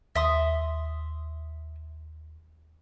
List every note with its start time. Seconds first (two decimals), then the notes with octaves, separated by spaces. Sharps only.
0.16 D#2 E5 C6 D#6